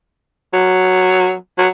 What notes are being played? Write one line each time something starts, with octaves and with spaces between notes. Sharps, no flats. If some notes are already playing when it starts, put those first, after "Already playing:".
F#3
F#3